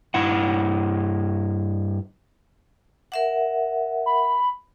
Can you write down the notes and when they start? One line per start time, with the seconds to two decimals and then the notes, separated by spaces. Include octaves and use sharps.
0.14 G2 E4 F#5
3.12 A#4 E5 F#5
4.06 B5